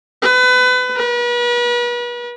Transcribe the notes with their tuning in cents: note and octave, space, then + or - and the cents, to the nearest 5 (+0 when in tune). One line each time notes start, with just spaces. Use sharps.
B4 +30
B4 -40